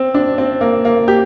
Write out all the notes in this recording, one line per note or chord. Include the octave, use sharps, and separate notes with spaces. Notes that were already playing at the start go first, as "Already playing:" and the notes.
Already playing: C4
D4
C4
A#3
A#3
G4